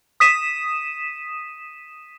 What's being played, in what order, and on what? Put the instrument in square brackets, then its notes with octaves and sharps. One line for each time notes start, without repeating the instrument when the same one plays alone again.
[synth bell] D#6 B6 D#7 E7